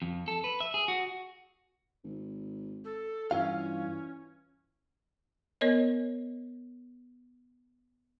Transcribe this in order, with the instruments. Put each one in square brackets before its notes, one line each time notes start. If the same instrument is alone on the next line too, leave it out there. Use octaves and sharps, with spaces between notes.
[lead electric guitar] F2
A4
B4
E5
G#4
F#4
[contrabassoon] G#1
[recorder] A4
[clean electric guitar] G2 F4 F5 [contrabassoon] E3 [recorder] C#4
[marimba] B3 A#4 C#5 D#5